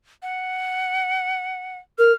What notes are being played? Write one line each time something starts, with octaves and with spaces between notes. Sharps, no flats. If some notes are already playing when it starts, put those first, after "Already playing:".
F#5
A#4 F6